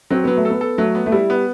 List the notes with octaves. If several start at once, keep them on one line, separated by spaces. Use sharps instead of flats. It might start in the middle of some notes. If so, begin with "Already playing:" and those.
F#3 C4
F#3 B3
A3
A4
B3
A4
F#3 A3
B3
A3
G3 E4
B3